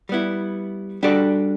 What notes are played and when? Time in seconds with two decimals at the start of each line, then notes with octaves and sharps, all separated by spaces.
0.09 G3 B3 E4
1.03 G3 D4 F#4 A4 D5